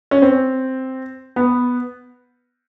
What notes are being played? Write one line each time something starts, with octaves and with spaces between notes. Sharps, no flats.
C#4
C4
B3